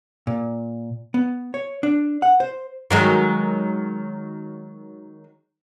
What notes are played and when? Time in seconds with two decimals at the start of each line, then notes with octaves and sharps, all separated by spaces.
0.27 A#2
1.14 B3
1.54 C#5
1.83 D4
2.22 F#5
2.40 C5
2.91 D#3 F#3 G#3